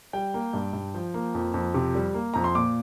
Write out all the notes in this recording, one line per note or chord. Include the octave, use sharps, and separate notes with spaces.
G3 G5
A#3
G2
G2
F3
A#3
F2
F2
C3
G3
A#3
F2 A#5
C6
A#2 D6